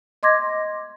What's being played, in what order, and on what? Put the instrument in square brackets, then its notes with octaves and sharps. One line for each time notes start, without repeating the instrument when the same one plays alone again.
[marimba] D#5 C6 D6 G#6 A#6